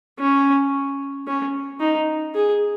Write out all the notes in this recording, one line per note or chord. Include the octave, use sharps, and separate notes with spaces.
C#4
C#4
D#4
G#4